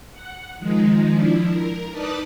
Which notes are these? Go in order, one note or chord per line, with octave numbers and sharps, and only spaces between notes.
F#5
D#3 F3 G#3 D#4
F3 D4 E4
A#4
D#4 B4 D5 A5 D6 D#6